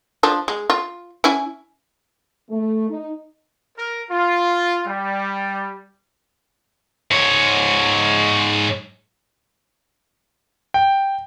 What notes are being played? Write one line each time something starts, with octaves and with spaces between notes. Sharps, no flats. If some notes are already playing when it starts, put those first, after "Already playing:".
F3 D4
G#3
F4
C#4 E4 G#5
A3
D#4
A#4
F4
G3
G#2 C#5
G5